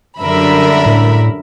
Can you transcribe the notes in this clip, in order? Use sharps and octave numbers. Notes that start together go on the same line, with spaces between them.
F#2 D3 G3 A#4 E5 B5
A2